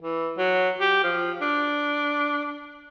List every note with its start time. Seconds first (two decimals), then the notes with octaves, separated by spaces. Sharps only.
0.02 E3
0.38 F#3
0.81 G4
1.03 F3
1.42 D4